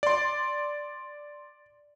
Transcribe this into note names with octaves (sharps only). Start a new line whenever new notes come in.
D5 C6